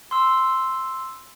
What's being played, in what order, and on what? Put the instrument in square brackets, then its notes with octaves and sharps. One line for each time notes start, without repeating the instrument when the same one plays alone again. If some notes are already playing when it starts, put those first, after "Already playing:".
[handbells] C6 E6